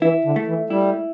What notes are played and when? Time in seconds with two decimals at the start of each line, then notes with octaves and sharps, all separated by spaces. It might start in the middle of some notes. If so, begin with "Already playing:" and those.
0.02 E3 E4
0.25 D3
0.36 A3
0.47 E3
0.70 G3 E4